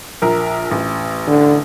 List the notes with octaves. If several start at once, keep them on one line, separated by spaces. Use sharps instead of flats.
A#1 A#4
A1
D3